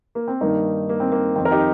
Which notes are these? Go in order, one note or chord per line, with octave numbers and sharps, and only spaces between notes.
A#3
C4
G2 D#3 A#3 D#4
A#3
C4
A#3
F2 D#3 C4
A#4
D#4 G4